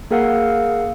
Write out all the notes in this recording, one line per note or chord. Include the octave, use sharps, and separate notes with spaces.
A#3 G#4 A#4 F5 F#5 E6